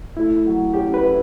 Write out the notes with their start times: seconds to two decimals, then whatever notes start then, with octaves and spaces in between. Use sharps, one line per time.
0.17 A3 E4
0.46 F#3
0.74 C#4 G4
0.94 B4
1.03 E4